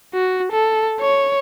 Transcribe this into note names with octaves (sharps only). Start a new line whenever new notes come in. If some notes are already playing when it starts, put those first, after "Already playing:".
F#4
A4
C#5